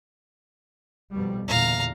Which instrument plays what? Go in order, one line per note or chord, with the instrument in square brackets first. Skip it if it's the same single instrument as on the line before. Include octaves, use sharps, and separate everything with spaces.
[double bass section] F2 B2 G3
[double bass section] E2 A#2 D3 [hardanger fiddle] F5 A#5